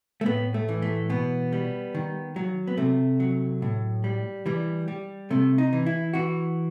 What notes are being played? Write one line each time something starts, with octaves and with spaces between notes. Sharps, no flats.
A3
A2 B3
A3
E3
A3
B2 B3
G3
D#3
F#3
B3
C3 A3
F#3
A2
G3
E3 G3
G3
C3 A3
D#4
E3
E4
E3 F#4